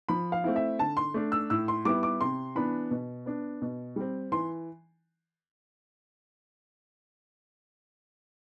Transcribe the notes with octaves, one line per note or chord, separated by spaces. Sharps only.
F3 B5
F5
A3 C4 E4
E5
D3 A5
C6
A3 D4
E6
A2 E6
C6
G3 B3 E4 D6
D6
C3 C6
E3 B3 D4 B5
B2
B3 D4
B2
G3 C4
E3 C6